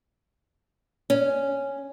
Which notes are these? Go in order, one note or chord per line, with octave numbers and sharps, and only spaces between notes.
C#4